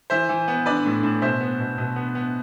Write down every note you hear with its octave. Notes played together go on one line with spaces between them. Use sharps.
E3 C5 E5
E3
B3
D4 B4 D5
A2
A2
B2 C5 E5
B3
B2
B2
B3
B3